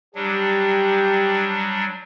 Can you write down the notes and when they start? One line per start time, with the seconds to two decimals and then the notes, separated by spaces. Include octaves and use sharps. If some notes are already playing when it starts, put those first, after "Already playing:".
0.15 F#3 G3 D4 G4